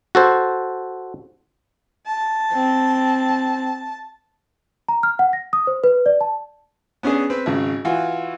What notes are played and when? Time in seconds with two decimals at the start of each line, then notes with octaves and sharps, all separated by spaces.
0.15 F#4 A4 C5
2.07 A5
2.53 C4
4.88 A#5
5.03 F6
5.19 F#5
5.33 A#6
5.53 D#6
5.67 C5
5.84 B4
6.06 D5
6.21 A5
7.03 B3 C#4 D4 G#4
7.30 C4 B4
7.46 G#1 C#3
7.85 E3 F4 F#4